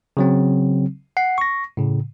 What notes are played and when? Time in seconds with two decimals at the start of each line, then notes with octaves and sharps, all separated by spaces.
0.17 C#3 F#3 C4
1.17 F#5 C7
1.38 C#6 A#6
1.77 A2 C#3